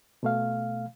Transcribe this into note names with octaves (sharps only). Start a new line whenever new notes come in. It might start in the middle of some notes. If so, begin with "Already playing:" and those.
B2 A3 F5